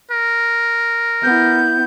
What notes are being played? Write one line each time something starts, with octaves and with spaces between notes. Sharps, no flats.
A#4
B3 E4 G6